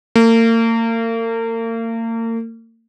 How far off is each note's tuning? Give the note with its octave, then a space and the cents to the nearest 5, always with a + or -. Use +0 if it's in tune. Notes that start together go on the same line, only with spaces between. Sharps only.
A#3 -40